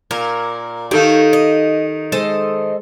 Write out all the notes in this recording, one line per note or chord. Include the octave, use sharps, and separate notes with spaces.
A#2 A#4 G#6
D#3 D#4 G4 A4 C#5 F5
D#5
G#3 A4 C5 D#5